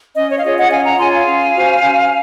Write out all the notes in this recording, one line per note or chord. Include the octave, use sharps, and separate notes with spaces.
C#4 D#5
C#5
F5
F4 G#4 C#5 D#5
D#5 F#5
C#4 F5 G#5
F#5 A#5
F4 G#4 C#5 G#5 C6
F5 G#5
C#4
F#4 C5
C#4